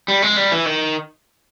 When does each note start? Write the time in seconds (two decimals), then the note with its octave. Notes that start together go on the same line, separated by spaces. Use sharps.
0.08 G3
0.22 G#3
0.37 G3
0.52 E3
0.66 D#3